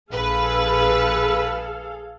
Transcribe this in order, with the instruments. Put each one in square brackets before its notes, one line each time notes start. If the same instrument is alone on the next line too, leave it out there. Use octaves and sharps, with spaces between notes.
[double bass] A#1 [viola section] G#4 A4 F5 [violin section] B4